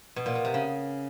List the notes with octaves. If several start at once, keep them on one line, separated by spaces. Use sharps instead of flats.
B2
A#2
B2
C3
C#3